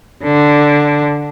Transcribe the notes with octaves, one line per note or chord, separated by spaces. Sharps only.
D3